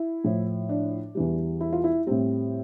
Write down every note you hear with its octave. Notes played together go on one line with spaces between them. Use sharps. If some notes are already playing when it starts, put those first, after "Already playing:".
Already playing: E4
A2 F3
D4
E2 E3 G3
E4
F4
E4
A2 G3 C4